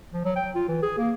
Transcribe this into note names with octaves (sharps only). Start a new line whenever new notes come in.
F3
F#3
G5
F4
E3
G#4
A#3